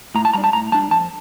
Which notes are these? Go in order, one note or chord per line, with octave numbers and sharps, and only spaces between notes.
A2 A#5
A5
G3 D4 A#5
A5
A2 A#5
G3 D4 A5
F2 A5